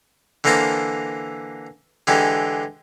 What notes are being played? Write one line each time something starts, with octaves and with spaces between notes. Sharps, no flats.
D3 E3 A#3 A#4 C5 A5
D3 E3 G#3 G4